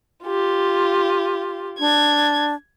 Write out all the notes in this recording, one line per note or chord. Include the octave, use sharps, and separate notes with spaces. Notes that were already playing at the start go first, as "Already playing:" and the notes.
F4 G4
D4 G#6